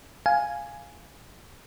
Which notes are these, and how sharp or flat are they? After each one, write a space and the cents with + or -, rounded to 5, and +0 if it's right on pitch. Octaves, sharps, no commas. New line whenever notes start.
F5 +0 G#5 +0